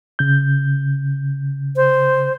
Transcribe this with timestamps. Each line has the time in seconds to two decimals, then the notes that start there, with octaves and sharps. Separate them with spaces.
0.19 C#3 G6
1.76 C5